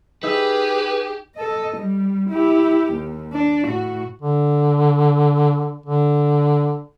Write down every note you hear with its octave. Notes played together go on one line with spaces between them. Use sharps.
D#4 G4 G#4 B4 E5
A4 D#5
G3
E4 G4
D#2
D4
A2 F#4
D3
D3